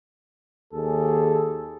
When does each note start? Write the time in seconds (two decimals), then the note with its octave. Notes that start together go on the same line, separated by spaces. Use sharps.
0.73 D#2 G#4 A4